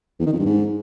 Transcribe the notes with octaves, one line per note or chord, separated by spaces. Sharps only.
E2
D#3
F2
G2
G#2